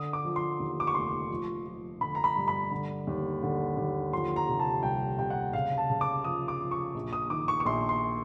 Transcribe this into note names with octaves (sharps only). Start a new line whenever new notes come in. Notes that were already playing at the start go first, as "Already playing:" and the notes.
Already playing: D3 D#6
D6
F3
C6
D#2
D6
C#6
F1 C6
F3
F3
D3 B5
A#5
B5
G2
B5
D3
D#2
D3
D#2
F3 C6
A#5
C3
A5
C2 G5
C3 G5
F#5
C#3 F5
A5
C#3
D6
F3 D#6
D6
F3
C#6
A#1
D#6
D#3 D6
C#6
C#6
A#1 C6
C6